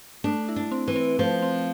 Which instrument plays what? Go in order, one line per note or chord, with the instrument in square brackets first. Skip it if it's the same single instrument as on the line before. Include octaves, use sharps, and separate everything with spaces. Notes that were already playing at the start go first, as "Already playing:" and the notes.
[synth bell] A3 [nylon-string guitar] D4
[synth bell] E4
[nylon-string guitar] D4
[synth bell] C4
[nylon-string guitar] E3
[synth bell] C4
[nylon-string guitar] F3 [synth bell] A3
[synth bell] C4